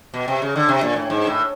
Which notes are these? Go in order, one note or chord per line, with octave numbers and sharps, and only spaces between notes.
B2
C3
C#3
D3
C3
A#2
A2
G#2
A2